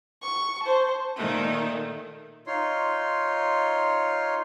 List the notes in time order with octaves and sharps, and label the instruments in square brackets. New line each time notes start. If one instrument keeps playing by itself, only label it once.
[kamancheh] C#6
C5 A5
[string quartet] A#2 D#3 A3
[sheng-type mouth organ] D#4 F4 C#5 C6